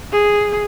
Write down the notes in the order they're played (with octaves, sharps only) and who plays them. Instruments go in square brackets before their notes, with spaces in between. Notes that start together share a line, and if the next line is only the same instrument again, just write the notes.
[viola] G#4